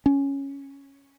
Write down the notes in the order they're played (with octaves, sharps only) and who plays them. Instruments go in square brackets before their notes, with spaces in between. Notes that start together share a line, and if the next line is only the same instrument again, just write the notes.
[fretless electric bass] C#4